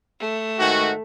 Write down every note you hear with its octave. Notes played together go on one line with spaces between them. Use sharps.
A3
G#2 D#3 F#4